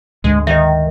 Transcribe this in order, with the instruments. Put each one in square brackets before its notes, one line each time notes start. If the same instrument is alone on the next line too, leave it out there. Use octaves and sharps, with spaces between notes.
[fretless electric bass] D2 G#2 D3 [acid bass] G#3
[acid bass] D#3 [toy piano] D#5 E5